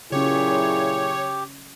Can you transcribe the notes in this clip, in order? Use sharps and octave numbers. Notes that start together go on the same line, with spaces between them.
A#2 C#3 F#3 C#4 E4 G4 G#4 C#5